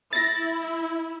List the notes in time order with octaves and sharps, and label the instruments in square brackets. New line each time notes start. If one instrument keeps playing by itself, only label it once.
[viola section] E4 [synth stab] A6 A#6